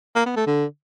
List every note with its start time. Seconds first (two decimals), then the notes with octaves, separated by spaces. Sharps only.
0.16 A#3
0.26 B3
0.37 A3
0.47 D3